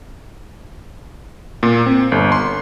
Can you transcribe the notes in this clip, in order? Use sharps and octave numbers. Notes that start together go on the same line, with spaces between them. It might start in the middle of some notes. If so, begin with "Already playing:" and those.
A#2
C4
G1
C6